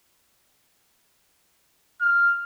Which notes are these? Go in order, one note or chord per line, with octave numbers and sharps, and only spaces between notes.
F6